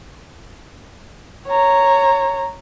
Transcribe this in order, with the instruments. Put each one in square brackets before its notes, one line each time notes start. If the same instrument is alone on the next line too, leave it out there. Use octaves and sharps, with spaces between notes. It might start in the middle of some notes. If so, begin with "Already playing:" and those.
[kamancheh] C#5 A#5